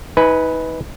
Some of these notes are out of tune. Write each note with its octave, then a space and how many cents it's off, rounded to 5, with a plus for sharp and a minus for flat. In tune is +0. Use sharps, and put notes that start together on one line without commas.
D#4 +40 B4 +0 G#5 +0